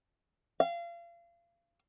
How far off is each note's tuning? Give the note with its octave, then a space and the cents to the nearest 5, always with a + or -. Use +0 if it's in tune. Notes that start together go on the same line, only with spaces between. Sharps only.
F5 -30